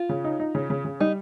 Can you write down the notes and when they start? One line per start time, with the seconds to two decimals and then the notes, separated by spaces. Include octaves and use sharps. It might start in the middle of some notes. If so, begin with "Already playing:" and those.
Already playing: F4
0.09 C#3
0.24 D#4
0.40 D#4
0.55 C#3
0.70 C#3
0.85 C#3
1.00 G3 D#4